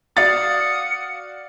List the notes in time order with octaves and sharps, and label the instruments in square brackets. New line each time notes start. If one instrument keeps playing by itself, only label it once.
[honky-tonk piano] F#4 D5 F5 [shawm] D#6 [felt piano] A6 [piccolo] C#7